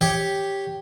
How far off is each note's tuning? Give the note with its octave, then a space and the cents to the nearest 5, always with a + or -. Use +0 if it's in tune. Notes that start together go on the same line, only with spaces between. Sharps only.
G4 +0 C#5 +0